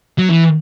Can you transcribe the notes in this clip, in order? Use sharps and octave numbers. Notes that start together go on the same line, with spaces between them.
F#3
E3